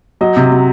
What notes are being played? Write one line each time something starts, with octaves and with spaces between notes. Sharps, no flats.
F#3 D#5
C3
F#3